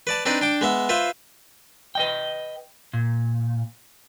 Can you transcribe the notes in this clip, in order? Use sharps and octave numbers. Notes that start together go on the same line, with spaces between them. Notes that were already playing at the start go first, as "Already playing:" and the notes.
B4 D5 A5
C4 D4 D#4 B4 D5
D4 G5 D6
G#3 B3 E5
F4 B4 C5 E5
B4 D#5 G5
A#2